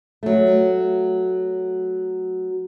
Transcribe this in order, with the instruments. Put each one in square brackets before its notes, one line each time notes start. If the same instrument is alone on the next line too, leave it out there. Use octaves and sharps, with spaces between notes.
[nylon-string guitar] F#3 A3